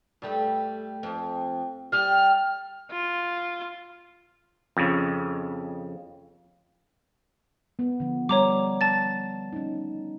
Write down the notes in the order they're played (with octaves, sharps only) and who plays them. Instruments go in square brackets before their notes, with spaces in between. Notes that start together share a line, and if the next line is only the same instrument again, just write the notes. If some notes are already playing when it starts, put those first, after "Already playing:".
[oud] G2 G3 A3
F2
[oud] G3 G4 [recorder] F6
[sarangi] F4
[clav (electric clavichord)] F2 C#3
[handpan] B3
D3 F3
[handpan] G3 [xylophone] C#5 A#5 D6
[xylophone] A5 A6
[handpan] C#4 D#4